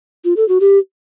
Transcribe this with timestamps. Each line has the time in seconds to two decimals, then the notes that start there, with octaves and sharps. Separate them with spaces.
0.25 F4
0.36 A4
0.48 F#4
0.60 G4